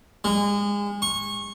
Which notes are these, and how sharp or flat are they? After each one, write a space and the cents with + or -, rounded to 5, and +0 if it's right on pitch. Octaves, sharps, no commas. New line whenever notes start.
G#3 -30
C#6 -25